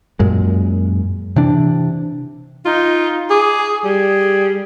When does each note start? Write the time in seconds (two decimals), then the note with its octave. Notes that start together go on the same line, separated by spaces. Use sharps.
0.19 F#2 A#2 G#3
1.36 C3 E3 D4
2.65 D#4 F4
3.30 G#4 D6
3.85 G3 G#4